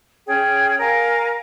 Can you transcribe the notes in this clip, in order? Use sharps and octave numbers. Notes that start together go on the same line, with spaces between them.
C#4 G#4 C#5 G5
A#4 F5 G#5